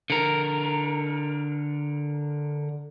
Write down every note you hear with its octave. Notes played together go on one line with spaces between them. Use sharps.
D3 A#4